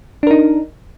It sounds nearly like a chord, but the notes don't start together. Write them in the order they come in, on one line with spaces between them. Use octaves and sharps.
D4 A#4 D#4